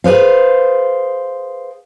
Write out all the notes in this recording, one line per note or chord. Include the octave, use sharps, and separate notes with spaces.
G#4 B4 C5 F5